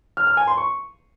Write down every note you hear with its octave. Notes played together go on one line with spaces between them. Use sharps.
F6
F6
G#5
C6
C#6